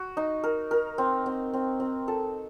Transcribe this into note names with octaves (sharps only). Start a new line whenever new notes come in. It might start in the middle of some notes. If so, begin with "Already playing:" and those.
Already playing: F#4
D#4
A#4
A#4
C4
C4
C4
C4
A4